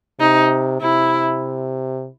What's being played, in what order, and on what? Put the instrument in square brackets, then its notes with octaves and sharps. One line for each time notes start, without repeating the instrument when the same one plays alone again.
[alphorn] C3 [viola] D#4
[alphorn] C3 [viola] E4